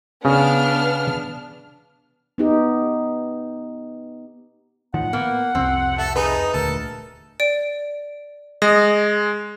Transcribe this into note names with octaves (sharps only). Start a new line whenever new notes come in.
C#3 B3 D4 F6
B3 D#4 G4
A2 D#3 F3 F#5
A#3 B3
C2 F2 C4
A3 A4
D#4 G#4 B4
D#1 D2 A4 A#4
D5 D7
G#3 D#6 A#6